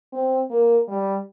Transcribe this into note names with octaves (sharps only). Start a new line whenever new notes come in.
C4
A#3
G3